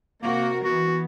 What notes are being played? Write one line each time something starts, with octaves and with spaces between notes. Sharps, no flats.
C3 A#3 F#4 A#4
E3 B3 F#4